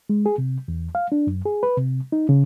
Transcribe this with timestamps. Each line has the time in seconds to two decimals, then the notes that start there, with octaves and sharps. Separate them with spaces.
0.10 G#3
0.26 G#4
0.38 C3
0.68 E2
0.95 F5
1.12 D4
1.27 F#2
1.46 G#4
1.63 B4
1.77 C3
2.12 D#4
2.29 C#3